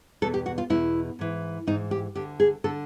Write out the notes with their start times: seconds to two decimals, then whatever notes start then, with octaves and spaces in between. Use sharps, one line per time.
0.22 E2 B2 A4
0.34 G4
0.46 F#4
0.58 F4
0.70 E2 B2 E4
1.19 G#2 E3
1.67 G#2 E3 D#4
1.91 G4
2.15 D2 D3 G4
2.40 G#4
2.64 D3 A4